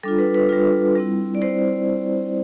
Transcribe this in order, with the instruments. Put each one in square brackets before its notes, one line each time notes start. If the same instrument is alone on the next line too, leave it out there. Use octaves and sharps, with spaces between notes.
[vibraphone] G3 D4 F4 A4
B4
B4
G3 D4 F4 B4
G3 C4 E4
D5
G3 C4 E4 C5